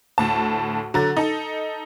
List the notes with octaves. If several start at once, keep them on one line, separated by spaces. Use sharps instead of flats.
D2 A2 A5
D3 F#3 A#5 A6
D#4 A4